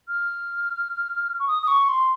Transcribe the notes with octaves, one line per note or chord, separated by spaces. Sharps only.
F6
C#6
D#6
D#6
C#6
C6